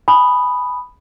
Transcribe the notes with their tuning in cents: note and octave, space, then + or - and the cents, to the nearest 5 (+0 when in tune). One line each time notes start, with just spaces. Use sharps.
G#5 +15 B5 +0 D#6 -10